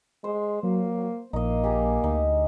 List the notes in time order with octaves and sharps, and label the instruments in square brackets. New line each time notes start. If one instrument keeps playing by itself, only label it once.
[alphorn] G#3 [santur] C5
[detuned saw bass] F#3 [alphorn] A#3
[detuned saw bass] A#1 [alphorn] A#3 [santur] D#4 D#5
[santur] G4 G#4 A#5
[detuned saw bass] D2 [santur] D#4